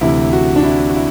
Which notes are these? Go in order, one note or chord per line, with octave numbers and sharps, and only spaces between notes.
D2 C3 E3 E4
F#4
D4
E4
F#4
E4